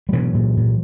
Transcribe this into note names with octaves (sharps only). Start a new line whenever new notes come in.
G3
B2 E3 F#3
A#2
A#2